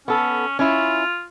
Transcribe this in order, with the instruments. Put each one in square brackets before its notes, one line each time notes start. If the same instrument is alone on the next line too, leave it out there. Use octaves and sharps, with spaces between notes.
[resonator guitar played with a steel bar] B3 A4 [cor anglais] C#4
[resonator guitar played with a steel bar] C#4 E4 [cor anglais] F4